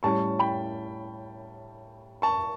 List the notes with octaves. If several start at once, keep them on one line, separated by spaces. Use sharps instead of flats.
A2 G3 C#4 A5 C#6
G5 B5
A5 C#6